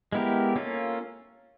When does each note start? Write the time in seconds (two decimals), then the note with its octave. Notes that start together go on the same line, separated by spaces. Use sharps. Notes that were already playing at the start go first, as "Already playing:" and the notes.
0.12 G#3 B3 E4 G4 A#4
0.56 A#3 C#4 F4 A4